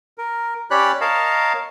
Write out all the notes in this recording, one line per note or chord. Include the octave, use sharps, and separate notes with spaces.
A#4
C#4 G4 C#5 D5 B5 F#6
A#4 C#5 D#5 F5 A5